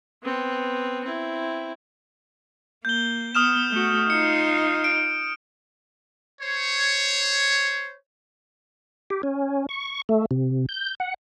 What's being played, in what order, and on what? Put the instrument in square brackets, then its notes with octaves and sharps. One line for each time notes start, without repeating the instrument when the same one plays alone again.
[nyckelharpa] B3 C4
C4 E4
[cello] A#3 [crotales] G6 G7
[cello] B3 [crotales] D#6 F6 E7
[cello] A3 F#4
[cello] D#4 F4 [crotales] C#7
[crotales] D7
[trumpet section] C5 C#5
[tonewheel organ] G4
C#4
C#6
A3
C3
G6
F#5